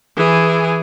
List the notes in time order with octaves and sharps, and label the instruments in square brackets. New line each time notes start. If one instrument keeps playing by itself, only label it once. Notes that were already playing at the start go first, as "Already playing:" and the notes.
[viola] E3 G#4